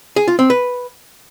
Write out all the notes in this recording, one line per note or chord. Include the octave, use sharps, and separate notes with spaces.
G#4
F4
C4
B4